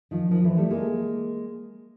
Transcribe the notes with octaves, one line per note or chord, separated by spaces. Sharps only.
D#3 F3
D#3 F3
D3 E3
G3 A3
G#3 A#3